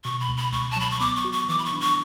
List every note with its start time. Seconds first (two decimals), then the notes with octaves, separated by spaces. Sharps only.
0.05 B2 C#6
0.20 B5
0.28 C#2
0.37 B5
0.52 C#2 C#6
0.71 A5
0.76 F#3 B5
0.91 C#6
1.00 B3 D6
1.16 C#6
1.25 F#4
1.32 C#6
1.49 E3 D6
1.59 B5
1.65 C#6
1.73 D4
1.81 C#6